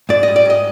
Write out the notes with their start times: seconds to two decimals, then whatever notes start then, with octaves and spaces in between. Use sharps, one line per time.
0.09 G#2 D5
0.23 D#5
0.28 G3
0.36 D5
0.45 G#2 D#5